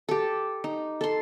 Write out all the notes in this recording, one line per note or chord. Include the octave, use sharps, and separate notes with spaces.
G4 A4
D#4
A4 C6